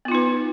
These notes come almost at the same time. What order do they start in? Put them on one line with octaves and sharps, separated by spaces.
B3 F4 D#4 B4